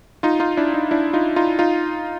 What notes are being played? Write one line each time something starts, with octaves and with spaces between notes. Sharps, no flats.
D#4 F4
D#4 F4
D4 E4
D#4
D4 E4
D#4 F4
D#4 F4
D#4 F4